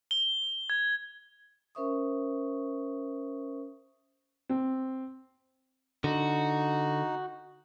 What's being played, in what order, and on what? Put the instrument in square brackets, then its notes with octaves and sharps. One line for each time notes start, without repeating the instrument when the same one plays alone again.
[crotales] G7
G#6
[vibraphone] C#4 A#4 C5 E5 C#6 D#6
[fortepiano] C4
[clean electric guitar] D3 [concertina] D#4 [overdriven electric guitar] F#4